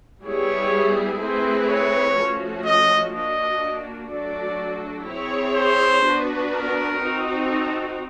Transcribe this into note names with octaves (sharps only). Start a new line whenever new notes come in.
G3 B3 E4 G#4 C#5
A3 C4 E4 G#4 B4 C5
C#5
F3 A3 C#4 F#4
D#5
A#3 D4 F#4 D#5
F#3 A3 D4 F#4 A4 D5
C4 E4 G#4 C#5
C5
B3 D4 F#4 B4
A#4
C4 D#4 F#4
A4